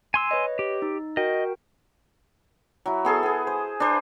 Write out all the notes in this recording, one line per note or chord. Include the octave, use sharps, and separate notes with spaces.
G#5 C6 E6
B4 C#5 D#5
G4
D#4
F#4 A#4 D#5 G5
F#3 E4
B3 G#4 A4
B3 G#4
C5
D4 B4 C5